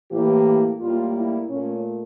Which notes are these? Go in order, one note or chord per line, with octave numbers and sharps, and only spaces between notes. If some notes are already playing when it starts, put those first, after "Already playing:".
A2 E3 A#3 G4
A2 G3 A#3 F4
E4
A#2 A3 C#4